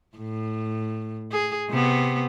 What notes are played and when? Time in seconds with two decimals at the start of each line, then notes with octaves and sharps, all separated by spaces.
0.18 A2
1.32 G#4
1.70 C3 B3